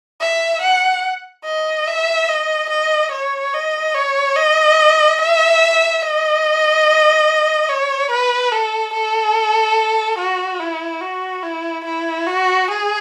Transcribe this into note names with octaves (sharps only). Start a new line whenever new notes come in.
E5
F#5
D#5
E5
D#5
D#5
C#5
D#5
C#5
D#5
E5
D#5
C#5
B4
A4
A4
F#4
E4
F#4
E4
E4
F#4
G#4